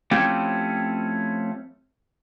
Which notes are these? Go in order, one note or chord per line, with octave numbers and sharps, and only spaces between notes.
F3 A3 C4 C#4 E4 G4